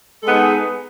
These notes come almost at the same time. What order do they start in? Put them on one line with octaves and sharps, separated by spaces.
A4 G#3 B3 D#4 G#4